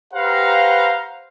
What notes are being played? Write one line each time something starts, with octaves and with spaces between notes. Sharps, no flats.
G4 B4 C5 F5 F#5 A#5